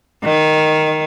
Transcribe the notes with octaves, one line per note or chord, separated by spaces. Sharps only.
D#3